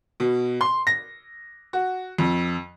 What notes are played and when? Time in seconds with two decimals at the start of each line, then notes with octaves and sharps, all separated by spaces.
0.20 B2
0.61 C6
0.87 A#6
1.73 F#4
2.18 F2